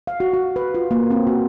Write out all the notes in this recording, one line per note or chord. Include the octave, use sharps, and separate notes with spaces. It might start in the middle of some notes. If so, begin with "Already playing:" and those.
F5
F#4
F#4
B4
F4
A#3
C4
F#4